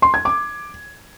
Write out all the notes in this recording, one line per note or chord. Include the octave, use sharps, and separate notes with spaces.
C6
G#6
D6